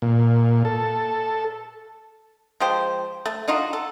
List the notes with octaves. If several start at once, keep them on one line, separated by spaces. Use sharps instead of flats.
A#2
A4
F3 G#3 G4 C5
A3
D4 D#4 F4 F#4
A4